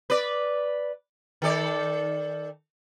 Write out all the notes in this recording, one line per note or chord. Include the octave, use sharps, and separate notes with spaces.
B4 D5
D#3 A4 D5